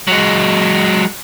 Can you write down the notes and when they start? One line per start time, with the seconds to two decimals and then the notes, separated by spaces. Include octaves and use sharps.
0.08 F#3 G#3